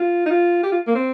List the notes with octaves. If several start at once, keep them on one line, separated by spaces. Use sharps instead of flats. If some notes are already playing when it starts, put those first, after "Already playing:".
Already playing: F4
D#4
F4
G4
F4
A#3
C4